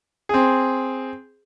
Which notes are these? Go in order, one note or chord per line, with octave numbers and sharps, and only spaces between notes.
C4 G#4